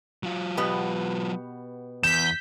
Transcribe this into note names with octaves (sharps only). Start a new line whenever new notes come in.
F#3 F4
B2 B3 G4
E2 G6 B6 E7